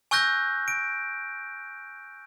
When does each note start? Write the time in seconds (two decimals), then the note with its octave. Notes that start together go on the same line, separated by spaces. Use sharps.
0.11 G#5 C#6 E6 F#6 G6 A#6
0.68 D7